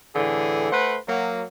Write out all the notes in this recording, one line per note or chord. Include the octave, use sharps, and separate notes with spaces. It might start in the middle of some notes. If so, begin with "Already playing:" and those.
A2 D3 E3 G#4
A3 B4 C5 F#5
F#3 A#3